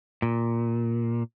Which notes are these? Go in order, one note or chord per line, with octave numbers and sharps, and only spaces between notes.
A#2